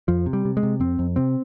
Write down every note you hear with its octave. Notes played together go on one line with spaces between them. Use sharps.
F2 F3
C3
G3
C3
G#3
C3
F2 C4
F2
C3 C4